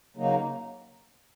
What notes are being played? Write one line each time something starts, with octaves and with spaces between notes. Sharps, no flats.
C#3 F#3 A#3 D#4